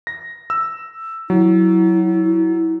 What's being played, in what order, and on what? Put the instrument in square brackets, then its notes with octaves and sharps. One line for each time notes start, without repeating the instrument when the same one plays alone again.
[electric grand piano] A#6
E6
[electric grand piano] F#3 [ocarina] E4